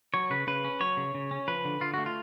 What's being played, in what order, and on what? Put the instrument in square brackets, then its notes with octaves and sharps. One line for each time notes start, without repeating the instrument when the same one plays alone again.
[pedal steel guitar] F#3 C#5
C#3 B4
C#3 B4
C#4
F#3 C#5
C#3
C#3
C#4
F3 B4
D3
D3 F4
A3 F#4
F4